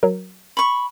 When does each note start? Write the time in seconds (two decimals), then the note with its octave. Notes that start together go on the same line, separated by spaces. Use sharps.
0.03 F#3 A#4
0.57 B5 C#6